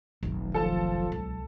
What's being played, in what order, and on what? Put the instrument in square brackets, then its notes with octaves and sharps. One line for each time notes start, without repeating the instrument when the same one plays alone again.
[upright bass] F1 D#3 [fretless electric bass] B1
[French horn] F3 [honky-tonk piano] A4 A5
[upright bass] C#2